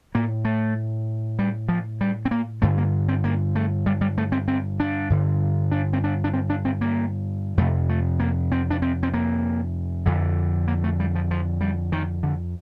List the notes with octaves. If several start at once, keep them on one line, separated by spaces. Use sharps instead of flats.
A2 A#3
A3
G3
F3
G3
C4
A#3
G2 D3 A3
A#3
C4
A#3
A3
G3
G3
A3
C4
C4
D4
G2 D3
D4
C4
D4
D4
C4
D4
C4
A#3
F2 C3 A3
A3
A#3
C4
D4
C4
C4
A#3
F2 D3
A#3
A3
G3
F3
F3
G3
D#3
D3